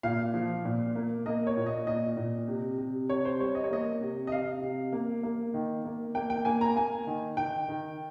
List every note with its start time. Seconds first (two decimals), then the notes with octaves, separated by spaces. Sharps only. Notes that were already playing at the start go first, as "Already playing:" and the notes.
0.03 A#2 F5
0.34 F3
0.65 A#2
0.96 A#3
1.26 A#3 D#5
1.47 C#5
1.57 A#2
1.66 D#5
1.87 A#2 D#5
2.17 A#2
2.48 C3
2.78 C3
3.09 C3 C#5
3.25 C5
3.40 G3 C#5
3.55 D#5
3.64 C#5
3.71 A#3 D#5
4.01 C3
4.27 D#5
4.32 C3 F5
4.62 C3
4.93 A#3
5.23 A#3
5.54 D#3
5.85 A#3
6.15 A#3 G5
6.30 G5
6.45 A#3 G#5
6.61 A#5
6.76 A#3 G#5
7.07 D#3
7.37 D#3 G5
7.68 D#3